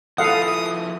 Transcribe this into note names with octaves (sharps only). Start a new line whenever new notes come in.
F3 E4 A4 F5 F#5 D#6